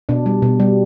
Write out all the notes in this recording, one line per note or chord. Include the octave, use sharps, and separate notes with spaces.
B2 D4
G3
B2
G3